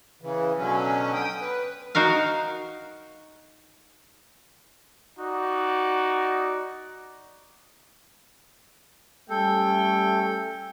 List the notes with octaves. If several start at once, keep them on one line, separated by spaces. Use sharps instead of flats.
C#3 E3
B2 D3 F#3 C#4
G5 D#6
B4
D#4 F#4 A#4 F5
D#4 F#4 D5
G3 A3 C#4 A4 G5